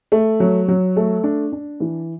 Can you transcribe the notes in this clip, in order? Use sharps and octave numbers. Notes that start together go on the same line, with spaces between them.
A3
F#3
F#3
A3
D4
D4
E3